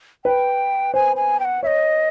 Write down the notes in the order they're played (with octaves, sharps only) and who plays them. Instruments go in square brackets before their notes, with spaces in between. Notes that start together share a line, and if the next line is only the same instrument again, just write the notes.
[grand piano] B4 [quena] G5
[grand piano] C5 [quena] G#5
[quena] G#5
G5
F#5
[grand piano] C#5 [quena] E5
[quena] D#5